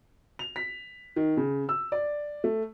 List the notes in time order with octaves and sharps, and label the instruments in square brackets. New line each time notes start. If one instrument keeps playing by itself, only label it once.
[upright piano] F7
B6
D#3
C#3
E6
D5
A3